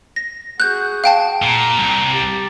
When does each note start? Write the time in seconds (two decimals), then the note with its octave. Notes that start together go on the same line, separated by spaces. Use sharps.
0.16 A#6
0.60 F#4 G#4 F#6 G6
1.04 F5 G5 A5
1.42 A#2 A#5
1.78 C2
2.12 G4 A5